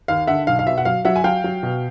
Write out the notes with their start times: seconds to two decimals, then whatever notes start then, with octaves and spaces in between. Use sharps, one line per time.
0.08 D#2 F5
0.27 D3 E5 F#5
0.47 B1 F5
0.59 F5
0.67 B2 E5
0.78 F#5
0.85 F#3 F5
1.05 F#3 E5 F#5
1.16 G#5
1.24 F#3 F5 G5
1.44 F#3
1.63 B2